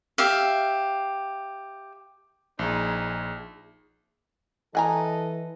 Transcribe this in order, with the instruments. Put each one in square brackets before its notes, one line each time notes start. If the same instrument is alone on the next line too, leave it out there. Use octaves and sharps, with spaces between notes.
[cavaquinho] G4 E5 F5
[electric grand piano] A#1 [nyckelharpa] D#4 G#4
[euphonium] E3 [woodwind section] A4 B4 D#5 [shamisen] F#5 G#5 A#5